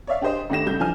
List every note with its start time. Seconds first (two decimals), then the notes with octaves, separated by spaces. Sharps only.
0.07 C#5 D5 E5 F5
0.21 D4 G4 G#4 C5 D#5
0.50 G#1 A3 D4 G4 A#6 E7
0.66 C#2 G3 A4 G6
0.79 E3 F3 D4 G#5 F6